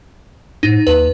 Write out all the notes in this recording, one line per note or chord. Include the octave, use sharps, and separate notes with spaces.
A2 D#4
D#2 B4